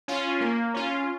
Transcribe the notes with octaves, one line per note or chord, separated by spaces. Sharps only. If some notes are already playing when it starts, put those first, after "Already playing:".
C#4 F4
A#3
C#4 F4